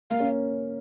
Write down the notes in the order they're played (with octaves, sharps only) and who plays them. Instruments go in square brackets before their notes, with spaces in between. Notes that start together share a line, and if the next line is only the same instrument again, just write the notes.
[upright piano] A#3 [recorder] F5
[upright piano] C#4